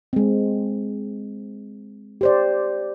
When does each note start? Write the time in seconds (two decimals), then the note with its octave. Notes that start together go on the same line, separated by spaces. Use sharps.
0.13 G#3 C4
2.21 G4 C5 D5